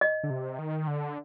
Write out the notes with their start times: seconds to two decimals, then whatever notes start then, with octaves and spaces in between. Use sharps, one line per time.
0.01 D#5
0.23 D3
0.30 C3
0.59 D#3
0.88 D3